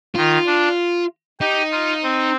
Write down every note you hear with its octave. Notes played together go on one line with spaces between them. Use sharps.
D#3 F4
D4
D#4 G4
F4
C4